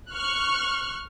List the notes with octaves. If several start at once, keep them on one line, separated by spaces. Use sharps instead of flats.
C#6 F6 F#6